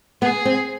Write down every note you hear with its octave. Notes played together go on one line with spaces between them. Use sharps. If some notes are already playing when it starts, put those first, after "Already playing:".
B3 G#4
C4